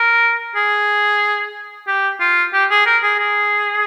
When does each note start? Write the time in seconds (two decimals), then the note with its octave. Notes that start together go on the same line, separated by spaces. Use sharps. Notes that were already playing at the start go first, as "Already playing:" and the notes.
Already playing: A#4
0.56 G#4
1.87 G4
2.20 F4
2.53 G4
2.70 G#4
2.86 A#4
3.03 G#4
3.19 G#4